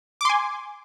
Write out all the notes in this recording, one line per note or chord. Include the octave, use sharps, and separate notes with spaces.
G#5 C6 D6